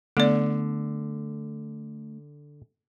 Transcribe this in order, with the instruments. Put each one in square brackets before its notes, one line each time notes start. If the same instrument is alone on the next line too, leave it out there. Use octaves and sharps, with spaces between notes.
[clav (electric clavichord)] D3 [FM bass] A3 [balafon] B3 D5